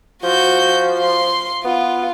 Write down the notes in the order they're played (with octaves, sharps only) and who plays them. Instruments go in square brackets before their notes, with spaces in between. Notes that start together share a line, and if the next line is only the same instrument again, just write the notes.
[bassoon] F3 [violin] F#4 G6
[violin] C6
[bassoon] B3 [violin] F4